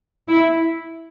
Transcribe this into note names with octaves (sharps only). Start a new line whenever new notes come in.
E4